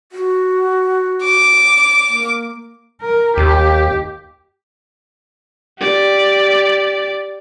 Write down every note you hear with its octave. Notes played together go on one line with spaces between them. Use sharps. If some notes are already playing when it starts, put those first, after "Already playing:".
F#4
D6
A#3
A#4
D#2 G4
G4 D5